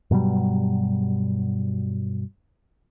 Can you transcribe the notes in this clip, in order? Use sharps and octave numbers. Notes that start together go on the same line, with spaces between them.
G2 B2 F#3 G3